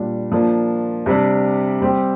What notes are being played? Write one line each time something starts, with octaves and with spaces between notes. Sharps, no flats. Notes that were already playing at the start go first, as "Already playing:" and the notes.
Already playing: A#2 G3 D4
F3 A#3 D4
C3 G3 D4
G3 C4 G4